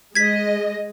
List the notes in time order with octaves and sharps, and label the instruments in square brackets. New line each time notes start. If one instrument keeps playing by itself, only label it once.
[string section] G#3 D#5 [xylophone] G#6 B6